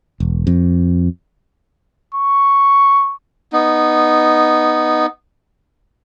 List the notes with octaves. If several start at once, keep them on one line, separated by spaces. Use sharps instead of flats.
E1
F2
C#6
B3 D#4